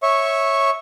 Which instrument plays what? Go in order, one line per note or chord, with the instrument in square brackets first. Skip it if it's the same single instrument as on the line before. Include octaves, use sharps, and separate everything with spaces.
[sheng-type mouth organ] C#5 E5 C#6